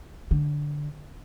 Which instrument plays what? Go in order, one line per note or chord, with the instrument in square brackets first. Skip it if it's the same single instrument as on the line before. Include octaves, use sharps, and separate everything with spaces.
[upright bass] D3